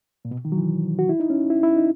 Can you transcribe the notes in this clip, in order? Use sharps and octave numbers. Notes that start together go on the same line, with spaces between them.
A#2
B2
D#3
F#3
E3
F#4
E4
D#4
C#4
E4
E4
D#4